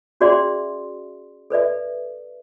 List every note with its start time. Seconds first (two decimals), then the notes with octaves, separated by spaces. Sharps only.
0.21 C#4 F#4 G#4 D5 E5 C6
1.50 A4 B4 D5 E5